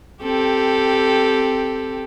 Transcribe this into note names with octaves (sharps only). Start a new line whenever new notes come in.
C4 G4 A4